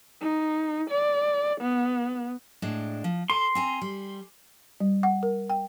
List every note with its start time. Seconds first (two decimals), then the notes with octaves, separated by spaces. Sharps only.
0.21 D#4
0.90 D5
1.61 B3
2.62 A2 G#3 D4
3.04 F3
3.30 A4 C6
3.55 C4 G#5 A#5
3.81 G3
4.80 G3
5.03 F#5
5.23 A#4
5.50 G5